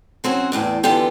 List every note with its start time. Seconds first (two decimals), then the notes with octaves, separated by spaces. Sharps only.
0.24 F#3 C4 C#4 F#4
0.52 E2 A2 E3 D5
0.83 D3 E3 B3 F4 G4 A4